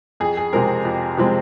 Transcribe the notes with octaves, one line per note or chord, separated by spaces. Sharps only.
F2 G#4
G#4
C3 F3 G#3 C4 A#4
F2
C3 F3 G#3 C4